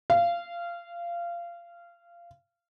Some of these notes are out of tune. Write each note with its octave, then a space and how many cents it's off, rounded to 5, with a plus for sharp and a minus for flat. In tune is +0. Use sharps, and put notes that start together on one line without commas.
F5 -20